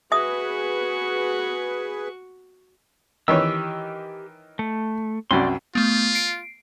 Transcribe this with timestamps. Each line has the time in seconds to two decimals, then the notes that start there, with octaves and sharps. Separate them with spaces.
0.12 F#4 G#4 B4 E5 C#6 D#6
3.28 D#3 E3 G4 C#5 E6
4.59 A3
5.31 C2 F#2 D5 C6
5.75 A3 B3 F4
6.15 C7 D7